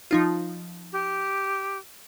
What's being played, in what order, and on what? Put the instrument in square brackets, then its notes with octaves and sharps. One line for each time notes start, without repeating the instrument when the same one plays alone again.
[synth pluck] F3 D#4 F4
[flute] G4